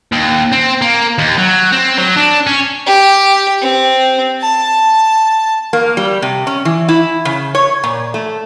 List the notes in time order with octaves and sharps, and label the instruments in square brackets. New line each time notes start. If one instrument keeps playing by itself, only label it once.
[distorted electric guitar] D#2
C4
A#3
D#2
F#3
C4
F#3
D4
C#4
[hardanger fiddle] G4
C4
A5
[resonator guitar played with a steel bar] A#3
G3
C3
C#4
E3
E4
C#3
C#5
A#2
A3